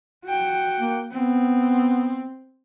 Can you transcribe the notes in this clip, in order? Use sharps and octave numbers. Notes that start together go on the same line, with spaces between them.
F#4 G5
A#3
B3 C4